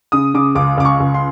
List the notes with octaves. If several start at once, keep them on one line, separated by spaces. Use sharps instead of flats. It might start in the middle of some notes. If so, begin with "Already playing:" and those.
C#3 D#6
C#3 D6
C#2 D6
C#2 D6
C#6
C#2
C6